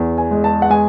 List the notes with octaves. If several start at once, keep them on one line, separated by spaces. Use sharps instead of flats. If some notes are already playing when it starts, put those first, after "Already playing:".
Already playing: E2
G#5
G#3
A5
F#5
G#3 G#5